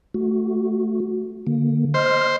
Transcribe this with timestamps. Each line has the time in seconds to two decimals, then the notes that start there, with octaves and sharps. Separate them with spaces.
0.14 A3 F#4
1.47 D3 A#3
1.94 C5 D#5 F6